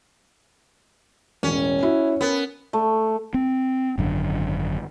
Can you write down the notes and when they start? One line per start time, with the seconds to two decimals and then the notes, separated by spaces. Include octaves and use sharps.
1.43 E1 A1 C#4
1.83 E4 F#4
2.21 B3 C#4 A#4
2.73 A3
3.34 C4
3.98 G#1 F#2 D3